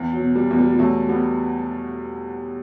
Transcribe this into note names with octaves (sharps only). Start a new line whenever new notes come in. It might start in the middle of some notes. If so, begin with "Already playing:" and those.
Already playing: E2
F#3
B2
G3
E2
G3
G3
E2 F#3 A3
G3 B3